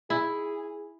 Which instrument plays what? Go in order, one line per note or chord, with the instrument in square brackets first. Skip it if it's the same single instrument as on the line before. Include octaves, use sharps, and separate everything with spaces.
[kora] E4 [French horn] G#4